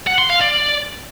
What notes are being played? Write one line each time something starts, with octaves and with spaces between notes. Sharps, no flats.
F#5
C6
F5
D5